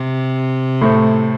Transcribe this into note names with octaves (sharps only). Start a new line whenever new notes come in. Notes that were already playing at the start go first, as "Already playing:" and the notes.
Already playing: C3
A2 A3 C4